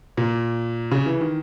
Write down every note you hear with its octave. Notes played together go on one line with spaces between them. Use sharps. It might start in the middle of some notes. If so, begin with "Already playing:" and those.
A#2
C#3
E3
D#3